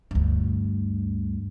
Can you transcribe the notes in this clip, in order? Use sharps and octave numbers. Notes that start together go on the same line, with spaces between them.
D2 G2